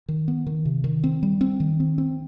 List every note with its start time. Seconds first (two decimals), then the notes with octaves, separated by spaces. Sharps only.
0.09 D#3
0.28 B3
0.47 D#3
0.65 C3
0.84 D#3
1.04 C4
1.23 G3
1.41 C4
1.60 D#3
1.80 C4
1.98 C4